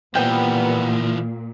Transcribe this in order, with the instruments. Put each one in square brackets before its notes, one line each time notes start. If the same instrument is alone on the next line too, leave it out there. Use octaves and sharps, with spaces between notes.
[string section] A#2 [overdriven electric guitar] E3 F3 [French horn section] G3 A#3 B3 [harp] G5